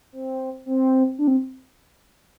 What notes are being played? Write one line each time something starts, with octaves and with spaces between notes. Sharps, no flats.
C4
C4
D4
C4